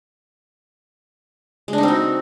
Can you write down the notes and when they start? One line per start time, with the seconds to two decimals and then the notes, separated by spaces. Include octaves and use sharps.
1.68 G#3
1.73 D4
1.78 D#4
1.83 C4
1.88 F#4